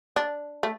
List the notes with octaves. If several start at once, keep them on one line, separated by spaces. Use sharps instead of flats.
D4
A3